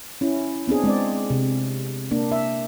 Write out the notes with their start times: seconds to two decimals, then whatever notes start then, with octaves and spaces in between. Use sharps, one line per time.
0.21 C#4 E4
0.68 B3 C4 D4 G#4
0.84 G#3 C4 D5
1.30 C3
2.11 A#3 D4
2.32 E5